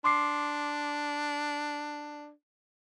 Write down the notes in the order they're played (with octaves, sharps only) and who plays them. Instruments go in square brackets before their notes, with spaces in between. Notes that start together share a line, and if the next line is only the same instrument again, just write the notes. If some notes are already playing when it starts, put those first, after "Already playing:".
[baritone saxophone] D4 [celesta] C6 D6 C7